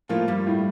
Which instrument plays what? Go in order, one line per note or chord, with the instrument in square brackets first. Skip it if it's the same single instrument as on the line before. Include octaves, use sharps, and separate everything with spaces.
[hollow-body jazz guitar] A2 A3 [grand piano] F3 A#3 F4
[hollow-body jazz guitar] G2 G3
[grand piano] A2